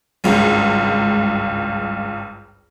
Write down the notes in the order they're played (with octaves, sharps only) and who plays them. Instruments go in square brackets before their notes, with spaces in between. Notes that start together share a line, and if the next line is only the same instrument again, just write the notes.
[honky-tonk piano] G#1 C#2 G2